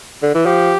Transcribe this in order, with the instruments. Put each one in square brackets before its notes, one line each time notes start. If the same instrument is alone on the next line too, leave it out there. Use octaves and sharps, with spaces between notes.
[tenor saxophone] D3
E3
[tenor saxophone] F3 [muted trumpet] G4